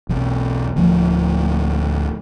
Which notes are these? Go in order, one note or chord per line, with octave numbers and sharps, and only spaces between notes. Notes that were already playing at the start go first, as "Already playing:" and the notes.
B1 E2
D1 D2 F3 A3